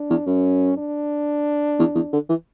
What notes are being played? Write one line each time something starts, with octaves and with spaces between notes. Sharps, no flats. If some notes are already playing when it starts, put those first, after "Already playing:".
Already playing: D4
E2
F#2 C#4
D4
E2
E2
D3
E3